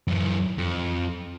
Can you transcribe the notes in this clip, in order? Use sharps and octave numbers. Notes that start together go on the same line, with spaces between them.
F#2 E3
F2